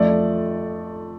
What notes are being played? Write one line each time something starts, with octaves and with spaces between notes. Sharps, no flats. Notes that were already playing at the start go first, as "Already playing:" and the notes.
Already playing: F2 F3 A3 D5